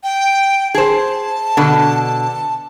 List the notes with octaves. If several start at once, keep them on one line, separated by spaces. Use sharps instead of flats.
G5
G#4 C5 A5
B2 D3